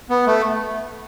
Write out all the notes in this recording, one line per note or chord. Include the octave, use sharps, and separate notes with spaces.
B3
A3